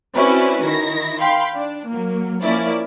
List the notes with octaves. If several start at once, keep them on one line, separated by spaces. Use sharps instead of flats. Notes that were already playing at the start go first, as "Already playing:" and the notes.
C4 C#4 E4 F#4 B4 D5
D#3 E4 A#6
F5 G5 B5 C6
D4
F#3 A#3
F3 A#3 C#4 E4 D5